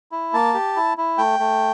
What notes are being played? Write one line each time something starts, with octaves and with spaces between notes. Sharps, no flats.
E4
A#3 A5
G4
E4
E4
A3 G5
A3